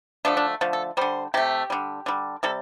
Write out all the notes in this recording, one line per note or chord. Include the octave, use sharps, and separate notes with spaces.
D3 F3 A3 D4
D4
D3 F3 A3
A4
D3 G3 C5
C3 A3 G4
D3 G3
D3 G3
C3 G3 A4